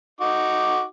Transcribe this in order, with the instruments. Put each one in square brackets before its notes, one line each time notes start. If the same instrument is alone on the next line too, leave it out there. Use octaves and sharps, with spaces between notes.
[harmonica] D#4 F#4 D6